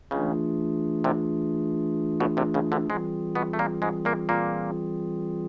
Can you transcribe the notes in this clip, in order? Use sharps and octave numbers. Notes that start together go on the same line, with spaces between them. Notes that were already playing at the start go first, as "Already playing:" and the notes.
C#2 C#3 E3 A3 D4 F4 G#4
C2 C3
B1 B2
C2 C3
C#2 C#3
D2 D3
G#2 E3 G3 G#3 C4 F4 G#4
B2 B3
A3
A#2 A#3
G#2 G#3
A#2 A#3
A#2 A#3